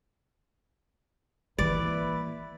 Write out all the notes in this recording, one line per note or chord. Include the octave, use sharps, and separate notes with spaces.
E3 A#3 E4 B4 D5